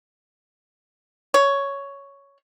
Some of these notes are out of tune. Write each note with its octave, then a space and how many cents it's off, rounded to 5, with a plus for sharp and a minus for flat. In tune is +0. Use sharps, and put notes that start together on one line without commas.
C#5 +5